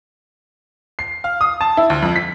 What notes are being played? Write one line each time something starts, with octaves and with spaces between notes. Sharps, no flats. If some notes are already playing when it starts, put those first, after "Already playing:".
C7
F5
D#6
A5
E4
D2
F2
B6